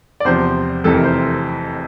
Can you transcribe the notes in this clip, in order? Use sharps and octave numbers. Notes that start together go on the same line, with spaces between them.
D5
E2 C3 F3 C5
F1 F2 C3 E3 A4
A#4
C5